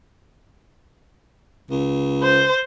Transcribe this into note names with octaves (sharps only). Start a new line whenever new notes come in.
C#2
C5